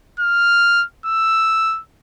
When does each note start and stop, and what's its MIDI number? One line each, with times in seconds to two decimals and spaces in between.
0.19 0.84 89
1.06 1.80 88